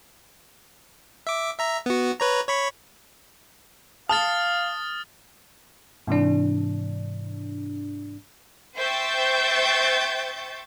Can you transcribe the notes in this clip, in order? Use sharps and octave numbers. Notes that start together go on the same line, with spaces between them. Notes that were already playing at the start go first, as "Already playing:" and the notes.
E5 D6
E5 A#5
B3 F#4
B4 C#5 A#5
C#5 B5 C#6
F5 A5 D#6 F6 A6
G#2 C3 E3 D4
C5 E5 G5 C#6 G6 A6